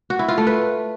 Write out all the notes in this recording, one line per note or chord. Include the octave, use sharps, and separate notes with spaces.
F#4
E4
F4
A3
B4